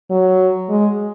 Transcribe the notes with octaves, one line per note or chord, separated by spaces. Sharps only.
F#3
G#3